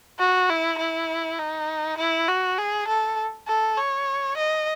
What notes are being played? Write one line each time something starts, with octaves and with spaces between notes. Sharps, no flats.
F#4
E4
E4
D#4
E4
F#4
G#4
A4
A4
C#5
D#5